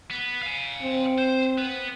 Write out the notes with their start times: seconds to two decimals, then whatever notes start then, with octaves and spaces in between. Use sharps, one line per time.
0.11 B3
0.42 F5 G#5
0.82 C4
1.18 C5
1.58 B3 B4